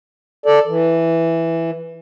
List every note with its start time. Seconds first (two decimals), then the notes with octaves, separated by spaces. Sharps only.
0.46 A4 D5
0.67 E3